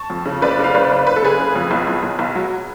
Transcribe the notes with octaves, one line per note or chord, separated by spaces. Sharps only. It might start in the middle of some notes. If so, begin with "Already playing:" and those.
Already playing: A5 C#6
F2
C#3
F#1 B4 D5
C#3
F5
F#1 B4 D5
F#1
F#1 B4
A4
C#3 G#4 B4
F#1
F2
B1
B1
B1
B1
F#3